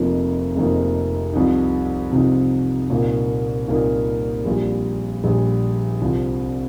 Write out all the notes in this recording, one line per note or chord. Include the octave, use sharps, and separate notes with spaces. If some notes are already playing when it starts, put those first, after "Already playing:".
Already playing: F1 F2 F3 A#3 D#4
F1 F2 F3 A#3 D#4
C2 C3 F3 D#4
C2 C3 F3 D#4
C2 A#2 A#3 D#4
C2 A#2 A#3 D#4
A#1 A#2 G3
A#1 A#2 G3
C2 C3 F3